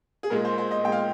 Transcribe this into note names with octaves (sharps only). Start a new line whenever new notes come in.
G#4
A#2 G#3 A#4
C5
C5
D#5
A#2 G#3 G5
F5